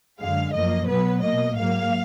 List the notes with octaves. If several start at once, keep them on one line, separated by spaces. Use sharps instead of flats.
F#2 D3 G#3 F5
F#2 F3 A#3 D#5
B2 F#3 B3 B4
B2 A#3 D#5
G#2 F#3 A#3 F5